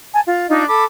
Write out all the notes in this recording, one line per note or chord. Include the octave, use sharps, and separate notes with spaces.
G#5 A5
F4
D4 D#4 F4 D#5
A4 B5 D6